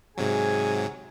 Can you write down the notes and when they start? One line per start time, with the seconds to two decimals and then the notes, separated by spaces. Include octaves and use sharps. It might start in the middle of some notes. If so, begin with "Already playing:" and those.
0.17 G#2 C3 F#3 G#4 G#5